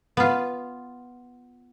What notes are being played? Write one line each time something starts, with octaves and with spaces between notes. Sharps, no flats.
B3 F4